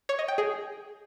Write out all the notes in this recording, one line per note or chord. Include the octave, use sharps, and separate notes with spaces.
C#5
D#5
G5
G#4